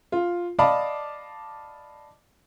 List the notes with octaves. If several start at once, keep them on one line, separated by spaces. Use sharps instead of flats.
F4
D5 D#5 F5 A5 B5 D6